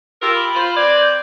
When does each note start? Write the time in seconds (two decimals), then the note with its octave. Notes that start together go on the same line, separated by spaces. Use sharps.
0.22 F4 G4 A#4 E6
0.35 B5
0.55 F4 C5
0.76 C4 B4 D5 G#6
1.01 G6